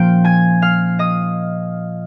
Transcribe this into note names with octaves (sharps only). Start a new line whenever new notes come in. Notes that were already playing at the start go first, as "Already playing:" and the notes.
Already playing: A#2 F3 A#3 C#4 F5 G5 G6
G#5 G#6
F5 F6
D#5 D#6